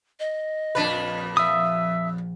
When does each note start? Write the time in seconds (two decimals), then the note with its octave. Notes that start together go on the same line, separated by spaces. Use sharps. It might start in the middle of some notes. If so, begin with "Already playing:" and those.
0.20 D#5
0.75 A#1 F2 D4 B4
1.37 F3 E5 D#6 E6